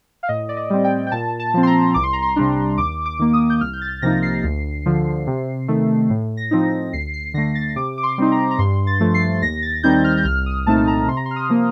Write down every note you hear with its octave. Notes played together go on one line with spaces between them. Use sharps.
F5
A2 D#5
D5
D#5
G3 C4
G5
G5
A#2 A5
A5
F3 C4
C6
A#5
C2 D6
C6
A#5
C6
C3 G3 D4
D#2 D6
D6
D#3 A#3
D#6
G6
C2 F6
G6
A6
C3 F3 A#3 D#4 A#6
C7
D2
D3 F3
C3
D#3 A3
A2
A#6
F3 C4 D#4
D2 C7
C7
D3 A3 A#6
A6
C3 D6
D6
C6
G3 C4 D#4
A#5
A#5
G2 C6
A6
F3 A3
C7
D#2 A#6
A6
D#3 G3 C4 D#4 G6
F6
G6
C2 F6
D#6
A#2 A3 C4 D#4 A5
A#5
C3 C6
A#5
C6
F6
D#6
F3 A#3